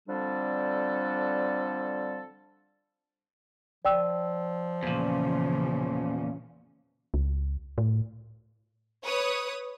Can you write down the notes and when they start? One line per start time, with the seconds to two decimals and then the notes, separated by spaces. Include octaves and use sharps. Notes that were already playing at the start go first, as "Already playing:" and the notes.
0.09 D3 F3 G3 C4 D4 A4
3.85 F3 D5 G5 E6
4.83 E2 A#2 C#3 E3 C#4
7.14 C#2
7.78 A2
9.05 B4 C#5 D#6